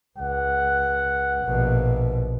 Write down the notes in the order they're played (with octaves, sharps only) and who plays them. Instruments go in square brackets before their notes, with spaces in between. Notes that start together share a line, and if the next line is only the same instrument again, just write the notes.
[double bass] C#2 [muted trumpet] F#5
[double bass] A#1 B2